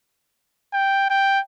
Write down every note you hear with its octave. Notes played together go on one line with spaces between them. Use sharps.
G5
G5